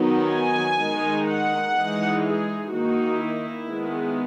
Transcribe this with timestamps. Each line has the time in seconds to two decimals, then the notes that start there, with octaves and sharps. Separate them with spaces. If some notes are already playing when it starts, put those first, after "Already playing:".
Already playing: D#3 F#3 B3 D#4
0.30 G#5
0.79 D#3 G#3 D#4
1.28 F#5
1.75 E3 G#3 D#4
2.25 G#4
2.72 D#3 A#3 D#4 F#4
3.21 E4
3.70 D#3 G#3 B3